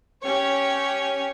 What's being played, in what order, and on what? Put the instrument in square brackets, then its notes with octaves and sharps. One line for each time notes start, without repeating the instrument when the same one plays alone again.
[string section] C#4 G4 C#5